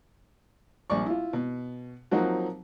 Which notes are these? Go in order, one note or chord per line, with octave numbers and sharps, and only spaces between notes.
A#1 G3 D5 C#6
E4 F4
B2
F3 F#3 A#3 C4 D#4 F#4